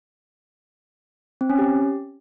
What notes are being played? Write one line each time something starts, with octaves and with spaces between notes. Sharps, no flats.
C4
C#4
G4